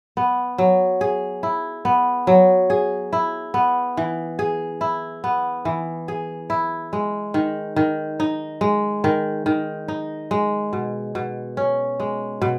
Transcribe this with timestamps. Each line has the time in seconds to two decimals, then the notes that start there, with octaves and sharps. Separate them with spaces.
0.17 B3
0.58 F#3
1.01 G#4
1.43 E4
1.85 B3
2.27 F#3
2.70 G#4
3.13 E4
3.54 B3
3.97 E3
4.39 G#4
4.81 E4
5.24 B3
5.65 E3
6.08 G#4
6.50 E4
6.93 G#3
7.34 D#3
7.76 D#3
8.20 D#4
8.61 G#3
9.04 D#3
9.46 D#3
9.88 D#4
10.31 G#3
10.73 B2
11.15 B2
11.57 C#4
12.00 G#3
12.42 B2